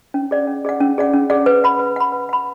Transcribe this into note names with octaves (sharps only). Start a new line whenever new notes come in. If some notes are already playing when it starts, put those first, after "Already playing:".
C#4
G#4 D5 F#5
C#4
G#4 D5 F#5
C#4
G#4 D5 F#5
C#4
G#4 D5 F#5
B4
F#5 B5
B4
F#5 B5
B4
F#5 B5